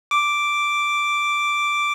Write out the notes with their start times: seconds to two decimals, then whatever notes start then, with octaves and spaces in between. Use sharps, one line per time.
0.11 D6